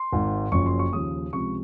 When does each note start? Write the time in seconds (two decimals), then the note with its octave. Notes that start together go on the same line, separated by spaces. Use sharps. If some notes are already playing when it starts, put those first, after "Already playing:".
Already playing: C6
0.13 G#1 G#2 D#3
0.52 F#1 F#2 F3 C#6
0.66 C6
0.79 C#6
0.92 D#2 C#3 F3 D#6
1.33 C#2 C3 F3 C#6